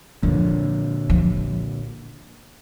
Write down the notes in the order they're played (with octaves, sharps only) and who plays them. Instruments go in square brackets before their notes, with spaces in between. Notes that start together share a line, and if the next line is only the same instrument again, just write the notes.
[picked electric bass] A#2 D3 [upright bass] F3
[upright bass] F3